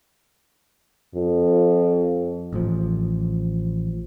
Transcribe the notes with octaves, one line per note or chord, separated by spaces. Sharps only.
F2
A1 F3